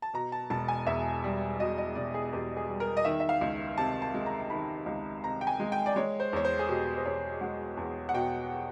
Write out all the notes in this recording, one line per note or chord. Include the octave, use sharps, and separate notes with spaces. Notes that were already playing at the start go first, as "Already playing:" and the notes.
A5
B2 A#5
A5
E1 A5
G#5
E2 E5
G3
B2 D#5
D#5
E1 D5
G#4
E2 G4
G#4
G3
A#4
D#5
D#3 E5
E5
F5
C#2
C3 A5
A5
G#3
A#5
D#3 B5
C#2
C3 A#5
G5
G#5
G#3
G5
D5
G#3 C#5
C5
E2 C#5
C5
G#4
B2 G4
C5
E2 C#5
G#3 F#5
E2
F#5
B2 G5